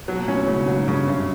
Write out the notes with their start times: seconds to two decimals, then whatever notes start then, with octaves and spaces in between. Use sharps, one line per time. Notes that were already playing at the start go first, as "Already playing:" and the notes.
0.08 B2 F#3
0.18 A#2
0.28 A2 C#4
0.47 G#2 C#3
0.66 A2 F#3
0.76 G#2
0.88 G2 C#3
1.07 F#2 C#3